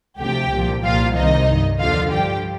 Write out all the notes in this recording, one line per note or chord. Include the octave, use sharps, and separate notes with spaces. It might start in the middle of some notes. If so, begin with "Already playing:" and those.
D2 C3 F3 G4 G5
C2 A#2 F3
C2 A#2 F3 F4 F5
C2 C3 D#3 D#4 D#5
G2 D#3
D#2 D3 F3 F4 F5
G2 F3 G4 G5